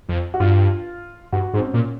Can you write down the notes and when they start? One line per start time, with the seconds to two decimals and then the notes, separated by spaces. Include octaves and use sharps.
0.09 F2
0.34 F#4
0.40 G2 F4
1.32 G2 F#4
1.54 G#2
1.57 C4
1.63 C#4
1.74 A#2